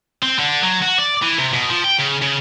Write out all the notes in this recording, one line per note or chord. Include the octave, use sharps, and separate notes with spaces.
C4
D3
F#3
F#4
D5
E3
C3
B2
F3
G5
C#3
C#3